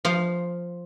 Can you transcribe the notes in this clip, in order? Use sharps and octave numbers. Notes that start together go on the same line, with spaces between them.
F3 C5 F5